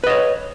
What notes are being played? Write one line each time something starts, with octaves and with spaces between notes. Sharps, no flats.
B4 C#5 D#5